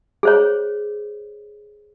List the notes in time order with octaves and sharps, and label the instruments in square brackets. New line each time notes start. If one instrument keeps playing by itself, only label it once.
[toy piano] G#4 C5 C#5